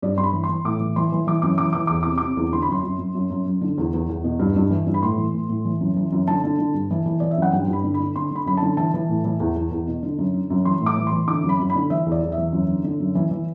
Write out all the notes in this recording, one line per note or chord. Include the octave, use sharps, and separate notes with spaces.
G2 D5
G2 C6
B5
E3
C6
E3
A2 D6
E3
E3 C6
E3
E3 D6
F#2 D6
E3 D6
E3 D6
E2 D6
D6
C3
C3 D6
E2
D3 C6
B5
F#2 C6
F#2
F#2
F#2
F#2
F#2
D3
E2
E2
E2
B2
G2
G2
E3
G2
B5
A2 C6
E3
A2
A2
E3
F#2
E3
F#2
D3 A5
D3
D3
G2
E3
E3
E3 D5
E5
F#2
F#5
G2 G5
G2
B5
D3
B5
D3
D3 C6
D3 B5
F#2 B5
D3 A5
E3 A5
E3
A2
E3
E2
E2
E2
B2
D3
F#2
D3
F#2
E3 C6
A2
D6
E3
E3 C6
D3 D6
F#2
B5
F#2
B5
D3
E3 E5
E2
D5
E2
E5
E3
F#2
D3
D3
F#2
E3
E3